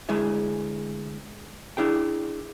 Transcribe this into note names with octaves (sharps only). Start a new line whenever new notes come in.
D2 G#3 E4 G#4 E5
D4 E4 G#4 G5